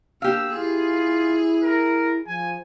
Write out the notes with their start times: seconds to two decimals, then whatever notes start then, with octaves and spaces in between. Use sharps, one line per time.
0.22 A#3 D4 G4 F5 E6
0.53 E4 F4 G#4
1.63 A#4
2.27 F3 G#5